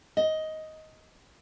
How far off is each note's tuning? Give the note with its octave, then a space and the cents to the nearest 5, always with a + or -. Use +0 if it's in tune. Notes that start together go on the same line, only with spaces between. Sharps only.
D#5 +10